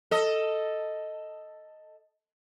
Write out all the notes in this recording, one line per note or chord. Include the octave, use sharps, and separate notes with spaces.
A4 D#5